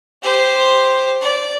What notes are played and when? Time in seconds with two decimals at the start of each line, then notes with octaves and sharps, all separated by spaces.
0.23 G4 C5
1.21 D5